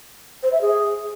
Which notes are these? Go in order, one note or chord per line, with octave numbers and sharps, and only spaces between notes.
C5
E5
G#4